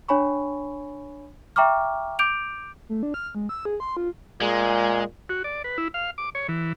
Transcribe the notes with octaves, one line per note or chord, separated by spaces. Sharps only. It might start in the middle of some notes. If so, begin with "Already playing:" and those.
D4 C#5 G#5 B5 C#6
E5 G5 A#5 C#6 D6 F6
D6 G6 D7 F7
A3
D4
F6
G#3
E6
G#4
C6
F4
A#2 G#3
F#4
D5
B4
E4
F5
D6
C#5
E3